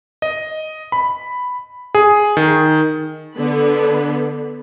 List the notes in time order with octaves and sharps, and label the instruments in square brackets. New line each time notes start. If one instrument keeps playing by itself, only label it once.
[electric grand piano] D#5
B5
G#4
D#3
[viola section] D3 B3 B5